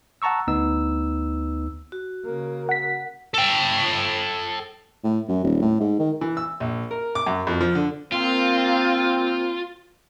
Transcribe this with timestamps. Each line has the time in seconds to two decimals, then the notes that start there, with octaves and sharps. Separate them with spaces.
0.22 F#5 A5 A#5 C#6 E6
0.47 D2 B3 D#4 E6
1.92 F#4
2.25 C#3 A#3
2.69 F#5 B6
3.34 A4 G5
5.04 A2
5.28 F#2
5.44 D#1
5.62 A2
5.80 G#2
5.99 D#3
6.21 E3
6.37 E6
6.60 A#1
6.91 A#4
7.15 D6
7.26 F#2
7.47 F2
7.61 F3
7.75 D3
8.12 A#3 C4 F4